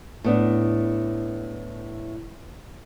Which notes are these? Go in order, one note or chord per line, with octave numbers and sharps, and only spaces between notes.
A2 B3 D4